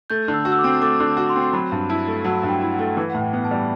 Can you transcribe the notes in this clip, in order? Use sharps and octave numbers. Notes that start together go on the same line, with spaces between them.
A3 G6
D3
E6
F#4
E6
D6
C4
A3 D6
D3
F#4
C6
C4
C6
F#3 B5
G2
E4 A5
A3
F#3 F#5
G2
G5
E4
F#5
A3
E3
A2 F#5
G5
B3
A5
G3